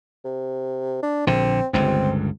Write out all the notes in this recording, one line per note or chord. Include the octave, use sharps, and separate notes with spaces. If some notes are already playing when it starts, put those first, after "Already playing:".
C3
D4
A#1 D3 C4
G1 C#2 G2 C4